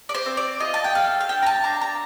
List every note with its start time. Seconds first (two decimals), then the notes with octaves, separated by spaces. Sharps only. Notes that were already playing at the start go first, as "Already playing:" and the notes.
0.09 D5
0.14 C5
0.26 C4
0.37 D5
0.60 F4 D#5
0.74 A5
0.84 G5
0.95 A4 F5
1.20 F5
1.29 D4 G5
1.42 A#5
1.46 A5
1.64 D4 A#5
1.82 A#5